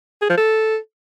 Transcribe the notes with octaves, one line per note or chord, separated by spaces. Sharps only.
G#4
F3
A4